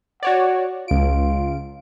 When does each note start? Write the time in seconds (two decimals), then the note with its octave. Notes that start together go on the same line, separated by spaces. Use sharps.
0.23 F#4 C#5 D5 F#5
0.88 C#2 F4 D7